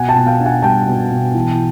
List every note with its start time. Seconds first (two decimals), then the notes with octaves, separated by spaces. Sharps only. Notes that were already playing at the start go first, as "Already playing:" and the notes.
Already playing: B2 F#5 G#5
0.09 G5 A5
0.15 B2
0.27 F5 G5
0.40 D4
0.45 F#5 G#5
0.63 G3 G5 A5
0.87 B2
1.11 B2
1.34 E3